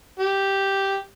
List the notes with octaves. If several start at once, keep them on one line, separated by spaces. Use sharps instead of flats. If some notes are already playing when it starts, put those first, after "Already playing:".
G4